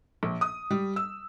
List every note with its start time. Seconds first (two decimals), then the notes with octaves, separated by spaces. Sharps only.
0.23 A#1
0.41 D#6
0.71 G3
0.96 E6